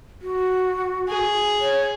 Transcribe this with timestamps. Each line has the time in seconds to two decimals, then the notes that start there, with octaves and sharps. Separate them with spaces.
0.21 F#4
1.09 G#4
1.60 C#5